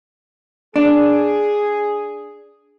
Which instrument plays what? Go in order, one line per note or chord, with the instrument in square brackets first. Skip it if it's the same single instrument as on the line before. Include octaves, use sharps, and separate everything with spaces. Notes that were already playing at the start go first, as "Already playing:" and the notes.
[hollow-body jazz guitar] D4 [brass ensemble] G#4